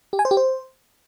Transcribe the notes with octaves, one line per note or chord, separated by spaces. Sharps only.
G4
G#5
C5
G4
C5